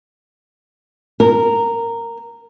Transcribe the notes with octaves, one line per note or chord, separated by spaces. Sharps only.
A#4